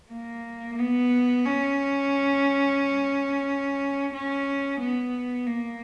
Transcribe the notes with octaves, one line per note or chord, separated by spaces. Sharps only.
A#3
B3
C#4
C#4
B3
A#3